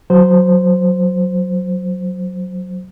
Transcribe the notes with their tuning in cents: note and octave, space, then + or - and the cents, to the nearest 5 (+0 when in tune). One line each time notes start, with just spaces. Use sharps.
F#3 +0 C5 -10